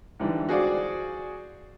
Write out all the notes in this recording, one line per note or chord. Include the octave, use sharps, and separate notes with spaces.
G#2 D3 E3 G3
F#4 G#4 C5 D5 F5 D6